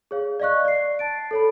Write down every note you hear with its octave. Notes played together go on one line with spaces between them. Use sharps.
G#4 C#5 F5
D5 D#5 F5 C#6 F#6
D5 C7
A5 A6 D7
A4 C#5 B5